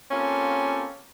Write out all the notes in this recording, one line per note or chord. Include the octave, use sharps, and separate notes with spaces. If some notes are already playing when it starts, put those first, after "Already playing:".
A#3 C4 C#4 F4 G4 A4